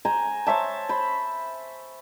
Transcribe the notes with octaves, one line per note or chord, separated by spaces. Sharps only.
C5 G#5 A#5 C6
C5 C#5 E5 A5
C5 B5